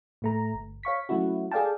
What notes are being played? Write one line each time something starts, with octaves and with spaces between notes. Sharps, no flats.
A2 A3 A#5
G1
C#5 F5 C#6 B6
F#3 A3 C#4 E4 F#4
G#4 A4 D5 F5 G5 A5